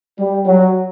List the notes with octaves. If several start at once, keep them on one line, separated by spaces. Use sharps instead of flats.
G3
F#3